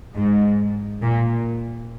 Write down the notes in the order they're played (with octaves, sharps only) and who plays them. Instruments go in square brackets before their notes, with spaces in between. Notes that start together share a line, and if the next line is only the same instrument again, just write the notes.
[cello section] G#2
A#2